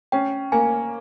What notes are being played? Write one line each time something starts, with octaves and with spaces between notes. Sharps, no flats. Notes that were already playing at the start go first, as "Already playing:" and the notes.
C#4 G5
A#3 G#5